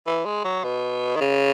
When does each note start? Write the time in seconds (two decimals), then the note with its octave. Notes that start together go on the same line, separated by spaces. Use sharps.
0.06 E3
0.25 G#3
0.44 F#3
0.63 B2
1.16 D#3
1.20 C#3